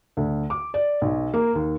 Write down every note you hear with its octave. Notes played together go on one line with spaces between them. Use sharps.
D2
D6
D5
B1
A#3
D#2